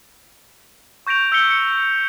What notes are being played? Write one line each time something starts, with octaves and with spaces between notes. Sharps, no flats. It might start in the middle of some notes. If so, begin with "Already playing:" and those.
C#6 G6 A#6 D7 F7
E6 G6 B6 C#7 G7
C#7